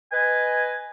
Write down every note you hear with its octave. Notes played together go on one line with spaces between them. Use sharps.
B4 D#5 G#5